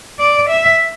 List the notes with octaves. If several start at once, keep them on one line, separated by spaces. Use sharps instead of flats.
D5
E5